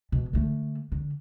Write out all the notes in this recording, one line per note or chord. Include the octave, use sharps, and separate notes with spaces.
B2
D3 A3
D3